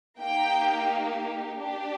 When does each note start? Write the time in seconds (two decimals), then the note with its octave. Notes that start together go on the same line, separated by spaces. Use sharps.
0.19 A#3 D#4 G4 G5
1.58 D4 G4